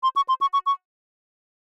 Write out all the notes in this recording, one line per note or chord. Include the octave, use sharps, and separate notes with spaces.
C6
C#6
C6
C#6
C#6
C#6